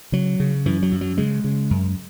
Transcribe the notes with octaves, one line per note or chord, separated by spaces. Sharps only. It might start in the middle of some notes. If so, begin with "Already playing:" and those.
C#3 F#3
C#3
F#2 E3
F#3
F#2
F#3
C#3 G#3
C#3
F#2